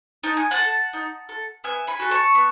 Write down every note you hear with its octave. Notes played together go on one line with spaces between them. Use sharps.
D#4 A5
G#5
F#5 A5
A4
D#4
A4
B3 E5 G#5
G#5 B5
F#4 A4
A5 C#6
B3